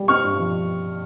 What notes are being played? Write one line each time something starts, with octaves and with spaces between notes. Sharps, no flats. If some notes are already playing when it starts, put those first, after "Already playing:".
Already playing: G3
C4 C#6 F6
G2
F3